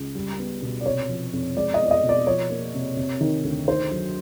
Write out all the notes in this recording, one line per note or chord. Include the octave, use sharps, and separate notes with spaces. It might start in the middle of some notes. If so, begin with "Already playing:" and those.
Already playing: C#2
G3
B3
B2
D5
C3 C#5
F3
F2
G#3 D5
D#5
B3
D5
D#5
B2
D5
F3 C#5
A#3
C3
C3
D#3
D2
D#3 C5
F#3